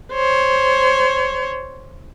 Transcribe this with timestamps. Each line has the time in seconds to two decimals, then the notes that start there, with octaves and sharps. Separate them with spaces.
0.13 C5 C#5